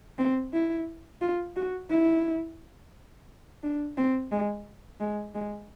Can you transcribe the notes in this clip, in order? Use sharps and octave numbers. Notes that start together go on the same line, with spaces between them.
C4
E4
F4
F#4
E4
D4
C4
G#3
G#3
G#3